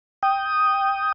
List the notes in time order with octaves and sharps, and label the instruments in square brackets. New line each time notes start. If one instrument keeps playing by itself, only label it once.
[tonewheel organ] G5 D#6